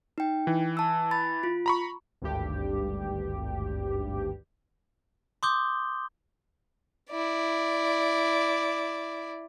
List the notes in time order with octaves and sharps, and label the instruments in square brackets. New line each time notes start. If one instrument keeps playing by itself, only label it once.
[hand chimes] D#4 G5
[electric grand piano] E3
[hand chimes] A5 E6
B5 A6
F4
[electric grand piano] A#5 B5 C#6
[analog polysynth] G#1 D2 G2 G4
[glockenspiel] C6 D6 D#6 G6 G7
[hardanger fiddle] E4 D5